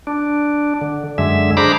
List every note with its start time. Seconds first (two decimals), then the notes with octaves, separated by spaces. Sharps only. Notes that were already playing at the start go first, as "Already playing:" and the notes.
0.07 D4
0.81 D3
1.18 F#2 D3 G#3 E5
1.57 D4 G#4 C5 A#5 B5 D6